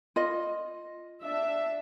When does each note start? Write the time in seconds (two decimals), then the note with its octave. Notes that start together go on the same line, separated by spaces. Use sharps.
0.16 F4 D#5
1.23 D4 E5